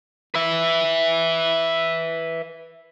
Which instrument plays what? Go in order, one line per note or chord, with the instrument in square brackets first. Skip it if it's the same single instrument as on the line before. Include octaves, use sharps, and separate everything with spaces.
[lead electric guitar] B4 E5